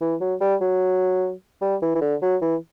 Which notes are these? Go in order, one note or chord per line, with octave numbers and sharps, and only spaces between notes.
E3
F#3
G3
F#3
G3
E3
E3
D3
F#3
E3